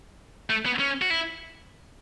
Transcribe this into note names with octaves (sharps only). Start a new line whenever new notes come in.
A3
B3
C#4
F#4
E4